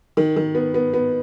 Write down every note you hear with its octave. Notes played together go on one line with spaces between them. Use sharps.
D#3
D#3
B3
B3
B3